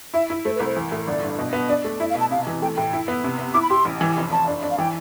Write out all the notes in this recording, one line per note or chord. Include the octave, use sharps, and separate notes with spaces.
E4 E5
E4
A3 C5
B4
C2
C5
E3
A2
G1 D5
G2
B2
B3
D4 D5
A3
E4 E5
F5
B2
A5
C3 F5
E3
A3 G5
A2 G5
E4
B3
C3
B3
E4 D6
B5
G4 C6
A1
E3
F1
F1 A5
D4
D4
F5
E3 G5